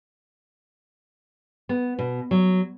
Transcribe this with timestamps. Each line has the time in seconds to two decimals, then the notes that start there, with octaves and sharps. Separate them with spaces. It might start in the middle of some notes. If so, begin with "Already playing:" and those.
1.69 B3
1.99 B2
2.31 F#3